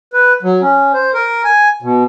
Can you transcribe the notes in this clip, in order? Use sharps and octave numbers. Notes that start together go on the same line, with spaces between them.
B4
F#3
C#4
C5
A#4
G#5
B2